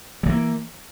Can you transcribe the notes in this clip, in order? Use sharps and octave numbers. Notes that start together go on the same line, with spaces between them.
E3 F#3 A#3